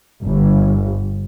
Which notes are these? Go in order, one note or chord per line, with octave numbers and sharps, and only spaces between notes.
G1